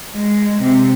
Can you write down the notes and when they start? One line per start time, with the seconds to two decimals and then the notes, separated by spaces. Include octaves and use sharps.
0.14 G#3
0.62 C3